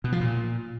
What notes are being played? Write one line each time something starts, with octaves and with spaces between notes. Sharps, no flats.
B2
F3
A#2